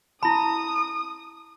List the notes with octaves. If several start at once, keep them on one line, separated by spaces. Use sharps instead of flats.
E4 A5 B5 D#6